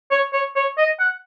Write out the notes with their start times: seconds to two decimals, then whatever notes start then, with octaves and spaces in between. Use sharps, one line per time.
0.11 C#5
0.33 C#5
0.56 C#5
0.77 D#5
0.99 F#5